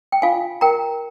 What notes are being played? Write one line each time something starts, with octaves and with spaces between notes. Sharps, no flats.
G5
F4 F5 G#5
A#4 G5 A#5